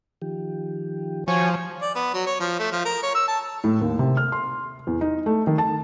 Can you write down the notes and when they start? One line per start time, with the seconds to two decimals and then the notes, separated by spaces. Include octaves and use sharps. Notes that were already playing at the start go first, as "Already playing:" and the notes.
0.22 D#3 F3 G4
1.28 F3 F#4 C5 C#5 G#5 C#6
1.82 D5
1.95 B3
2.14 F#3
2.26 C#5
2.40 F3
2.59 A3
2.72 F3
2.85 A#4
3.02 C#5
3.15 E6
3.28 A5
3.64 A2
3.81 D#2
3.99 C3
4.17 F6
4.32 C6
4.87 E2
5.01 D#4
5.26 A3
5.47 D#3
5.58 A5